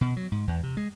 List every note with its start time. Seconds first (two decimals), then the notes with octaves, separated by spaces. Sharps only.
0.01 B2
0.17 F#3
0.32 G#2
0.48 E2
0.63 C3
0.77 G#3